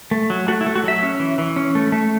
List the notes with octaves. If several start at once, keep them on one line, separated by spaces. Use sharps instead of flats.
A3
F#3
A3 F#4
E4
A3
F#4
F#3 E5
C#4
E3
E3
C#4
A3
A3